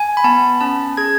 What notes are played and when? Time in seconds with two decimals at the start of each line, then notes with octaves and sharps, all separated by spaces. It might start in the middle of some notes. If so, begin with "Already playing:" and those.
Already playing: G#5
0.17 B5
0.24 B3 A5
0.61 C#4 A5
0.97 G#4 G#6